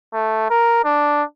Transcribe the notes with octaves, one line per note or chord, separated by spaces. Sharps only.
A3
A#4
D4